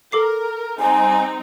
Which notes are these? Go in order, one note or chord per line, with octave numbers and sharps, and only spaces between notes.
A4 A#4 D6 C7
G3 C4 D#4 G#5